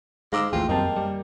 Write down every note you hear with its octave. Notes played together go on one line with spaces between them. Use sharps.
G#2 G#3 F5 D6 E6
A1 D#2 A2 F4 G#4 G5
F#2 G3 A#3 C4 D#5 G5 A5
G3